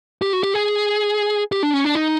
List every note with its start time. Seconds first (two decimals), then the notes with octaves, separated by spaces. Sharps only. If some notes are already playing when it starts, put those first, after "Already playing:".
0.22 G4
0.33 F#4
0.43 G4
0.54 G#4
1.52 G4
1.63 D4
1.74 C#4
1.84 D4
1.95 D#4